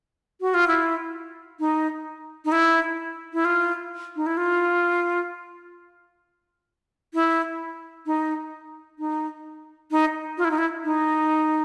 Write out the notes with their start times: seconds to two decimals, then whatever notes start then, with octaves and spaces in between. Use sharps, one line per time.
0.41 F#4
0.54 F4
0.68 E4
1.60 D#4
2.45 D#4
2.52 E4
3.33 E4
3.45 F4
4.16 D#4
4.26 E4
4.37 F4
7.14 E4
8.06 D#4
8.99 D#4
9.91 D#4
10.38 F4
10.45 E4
10.51 D#4
10.58 E4
10.84 D#4